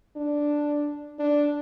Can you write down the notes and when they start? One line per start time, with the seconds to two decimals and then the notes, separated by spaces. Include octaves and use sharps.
0.16 D4
1.19 D4